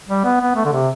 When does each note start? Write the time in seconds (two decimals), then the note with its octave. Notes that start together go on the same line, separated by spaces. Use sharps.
0.09 G3
0.24 B3
0.41 B3
0.56 A3
0.65 D3
0.72 C3